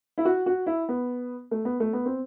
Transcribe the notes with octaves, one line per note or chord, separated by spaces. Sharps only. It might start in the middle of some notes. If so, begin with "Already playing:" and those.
E4
F#4
F#4
E4
B3
A3
B3
A3
B3
C4